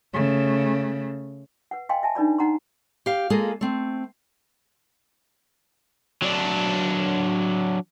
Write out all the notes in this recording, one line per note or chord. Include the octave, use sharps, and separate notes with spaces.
C#3 A3
B4 F#5
D#5 F5 G5 G#5 C6
D#5 E5 G#5 A5
D4 D#4 B4 D5 B5
D#4 F#5 A#5 C6
G4 F5
G#3 A#3 F4 G#4 A4
A3 C4
F#3 D4